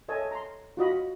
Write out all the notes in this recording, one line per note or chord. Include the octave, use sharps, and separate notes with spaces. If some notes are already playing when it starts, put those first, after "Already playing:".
A4 C#5 D#5 E5 G#5 A5
A#5 C6
F4 F#4 D#5 B5